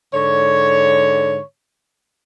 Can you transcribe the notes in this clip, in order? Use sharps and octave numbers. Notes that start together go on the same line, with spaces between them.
G#2 D3 C#5